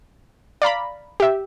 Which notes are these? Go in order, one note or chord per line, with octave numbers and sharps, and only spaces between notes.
D5 F5 A#5 B5
G4 E5